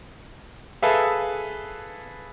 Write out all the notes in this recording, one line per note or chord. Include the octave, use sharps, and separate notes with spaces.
G#4 A4 B4 E5 F5